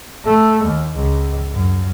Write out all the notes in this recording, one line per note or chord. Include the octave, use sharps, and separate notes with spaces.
A3
D#2
C#2
F#2